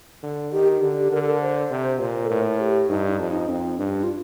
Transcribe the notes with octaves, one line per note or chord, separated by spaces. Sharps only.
D3
D#3 G4
G4
D3
G4
D3 A#4
A4
A#4
C5
C3
A#2
A4
A2 A#4
G4
G2 D#4
D#4
F2
D#4
F2 C4
G2 D4
F4